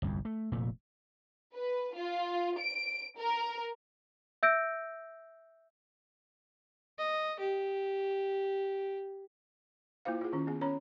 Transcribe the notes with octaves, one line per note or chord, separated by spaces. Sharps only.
G1 C2 F2
A3
F1 A#2 A3
B4
F4
D7
A#4
E5 E6 G6 A#6 D7
D#5
G4
A#3 E4 F4 C5 F5
F4 G#4
D#3 C#4
B3 G#4
C#4 C#5 A#5 B5